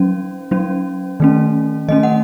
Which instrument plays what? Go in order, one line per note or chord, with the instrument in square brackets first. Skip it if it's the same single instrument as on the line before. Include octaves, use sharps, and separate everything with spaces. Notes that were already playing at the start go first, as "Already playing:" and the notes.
Already playing: [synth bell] F#3 C#4
F#3 C#4
D#3 A3 C#4
D#3 A3 C#4 D#5
F#5